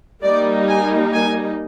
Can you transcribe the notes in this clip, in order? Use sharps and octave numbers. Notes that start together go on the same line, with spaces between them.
G3 A#3 D#4 D5
G#5
G#5